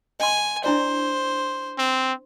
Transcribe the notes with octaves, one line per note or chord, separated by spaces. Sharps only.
D#5 G#5 C6
D4 E4 C5 D5
C4